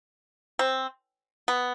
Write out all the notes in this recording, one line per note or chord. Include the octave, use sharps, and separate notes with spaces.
C4
B3